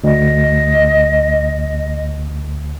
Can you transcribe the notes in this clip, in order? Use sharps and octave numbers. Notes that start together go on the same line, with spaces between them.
D2 D#5